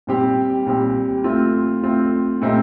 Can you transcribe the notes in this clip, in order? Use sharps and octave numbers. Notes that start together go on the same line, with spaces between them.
A#2 G3 C4 G4
A#2 G3 C4 G4
A3 C4 F4
A3 C4 F4
A#2 A3 C4 D#4 G4